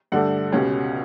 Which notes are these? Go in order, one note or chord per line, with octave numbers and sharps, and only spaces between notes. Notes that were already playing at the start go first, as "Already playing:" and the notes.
G2 D3 A3 D4 F#5
C#2 B2 G3 C#4